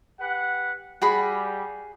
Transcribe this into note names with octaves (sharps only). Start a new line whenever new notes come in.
G4 B4 F#5
G3 F#4 G#4 B5